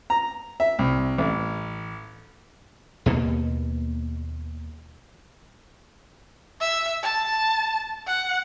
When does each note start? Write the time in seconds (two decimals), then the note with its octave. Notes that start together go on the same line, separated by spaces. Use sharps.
0.10 A#5
0.60 E5
0.79 C2
1.18 A1
3.06 D#2 B2 A#3
6.61 E5
7.03 A5
8.07 F#5